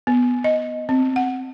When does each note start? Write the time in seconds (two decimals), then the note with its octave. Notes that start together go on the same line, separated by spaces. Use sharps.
0.07 B3
0.44 D#5
0.89 C4
1.16 F#5